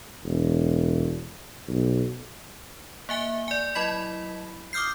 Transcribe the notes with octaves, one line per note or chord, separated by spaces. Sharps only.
E1
B1
A#3 E5 G#5 G7
D5 G#5
F#3 E4 D#5 B5 B6
D6 D#6 F6 G6 C7